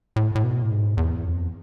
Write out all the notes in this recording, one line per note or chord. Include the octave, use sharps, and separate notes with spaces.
A2
A2
B2
A2
G#2
E2
F2